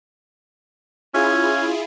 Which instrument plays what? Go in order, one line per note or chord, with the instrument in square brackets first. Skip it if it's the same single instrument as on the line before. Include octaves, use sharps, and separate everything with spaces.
[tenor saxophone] C#4 [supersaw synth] E4 F4 G#4